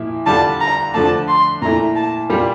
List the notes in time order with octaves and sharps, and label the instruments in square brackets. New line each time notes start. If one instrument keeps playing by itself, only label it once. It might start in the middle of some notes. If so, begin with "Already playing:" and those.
Already playing: [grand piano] A#2 F3 E4
[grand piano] D3 G3 D4 F4 [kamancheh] A5
[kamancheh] A#5
[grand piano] D3 F3 A3 D4 [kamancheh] A5
[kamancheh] C6
[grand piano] A#2 A3 E4 [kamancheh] A#5
[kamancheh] A5
[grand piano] A#2 G3 A#3 F4